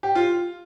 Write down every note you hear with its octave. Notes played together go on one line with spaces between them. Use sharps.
G4
F4